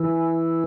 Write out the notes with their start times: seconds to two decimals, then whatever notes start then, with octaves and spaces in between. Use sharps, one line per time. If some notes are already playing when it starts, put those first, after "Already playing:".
Already playing: E3